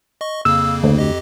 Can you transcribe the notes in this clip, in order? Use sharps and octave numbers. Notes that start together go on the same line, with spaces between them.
D#5 C#6
F2 C#3 A#3 E6
D2
F2 G4 D#5